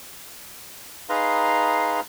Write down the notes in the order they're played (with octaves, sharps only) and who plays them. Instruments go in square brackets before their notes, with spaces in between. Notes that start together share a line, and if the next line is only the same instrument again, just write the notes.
[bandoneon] D#4 G#4 B4 F5 A#5 C6